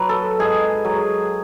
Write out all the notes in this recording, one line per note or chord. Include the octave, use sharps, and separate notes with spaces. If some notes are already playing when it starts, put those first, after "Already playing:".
Already playing: F#3 B4
A4
G#2 G#4
F#3